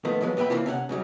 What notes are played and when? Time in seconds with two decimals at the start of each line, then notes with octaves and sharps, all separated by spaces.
0.05 D#3 F3 A3 B3
0.21 D#3 F3 F#3 G#3 B3
0.37 A#2 B3 E5 G5 B5
0.50 C#3 E3 A#3 C4 F4
0.66 C3 C#4 E5 F#5
0.89 G#2 C#3 F#3 G3